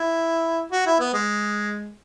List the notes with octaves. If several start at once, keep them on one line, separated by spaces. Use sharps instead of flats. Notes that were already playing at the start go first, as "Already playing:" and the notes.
Already playing: E4
F#4
E4
B3
G#3